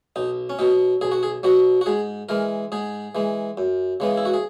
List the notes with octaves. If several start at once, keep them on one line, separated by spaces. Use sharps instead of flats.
B1 D#4
C#4
B2 F#3 D#4
B1 G#4
F#4
G#4
B2 F#3 F#4
F#4
G#2 G#4
E3 G#3 A#4
G#2 G#4
E3 G#3
F#2
C#3 E3 G#3 B3
E4
F#4
G#4